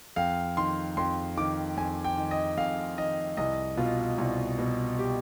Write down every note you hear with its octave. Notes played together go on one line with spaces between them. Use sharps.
F2 F5
D#3 C6
F2 C6
D#3 D6
F2 G#5
G5
D#3
D#5
F2 F5
D#3 D#5
C2 D#5
B2 F4
C2
B2
G4